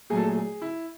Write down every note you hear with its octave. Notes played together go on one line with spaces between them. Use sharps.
A#2 F#3 A3 G#4
A4
G#4
G#4
E4